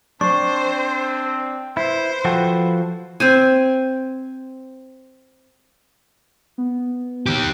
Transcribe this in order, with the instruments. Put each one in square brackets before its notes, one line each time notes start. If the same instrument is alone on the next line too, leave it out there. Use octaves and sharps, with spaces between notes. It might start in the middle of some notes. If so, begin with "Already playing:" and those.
[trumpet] C4 [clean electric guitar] D4 [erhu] C5 [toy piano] C#6
[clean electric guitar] E4 [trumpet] B4 [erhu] C5
[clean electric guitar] F3 F#4 A4 [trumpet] B4 [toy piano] G5
[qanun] C4 C5 G#5
[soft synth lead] B3
[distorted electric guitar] D#3 G4